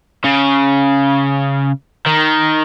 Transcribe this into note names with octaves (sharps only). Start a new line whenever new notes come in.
C#3
D#3